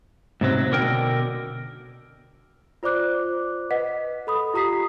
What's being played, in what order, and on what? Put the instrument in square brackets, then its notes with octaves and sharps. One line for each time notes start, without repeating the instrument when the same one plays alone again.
[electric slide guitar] G#2 C3 F#3
B2 D3 A#4 G5
[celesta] F4 C5 D5 D6 F#6
B4 D#5 F#5 B6
A4 B5 D#6
F4 G4 A#5 D#6 B6 C7